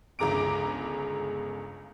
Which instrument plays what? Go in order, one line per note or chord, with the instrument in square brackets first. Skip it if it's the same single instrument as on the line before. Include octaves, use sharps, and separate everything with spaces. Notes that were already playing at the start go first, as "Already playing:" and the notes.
[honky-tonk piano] G1 C#2 G#4 A#5 D6 D7